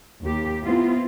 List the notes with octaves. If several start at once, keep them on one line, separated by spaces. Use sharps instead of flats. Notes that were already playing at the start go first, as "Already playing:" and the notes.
D#2 G4
B3 C4 E4 F4